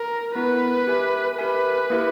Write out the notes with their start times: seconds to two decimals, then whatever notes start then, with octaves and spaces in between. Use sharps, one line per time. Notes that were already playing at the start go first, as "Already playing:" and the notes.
Already playing: A#4
0.35 B3 E4 A#4 B4
0.87 G4 A#4 E5 G#5
1.38 G4 A#4 B4 E5 G#5
1.90 A#3 E4 G4 A#4 E5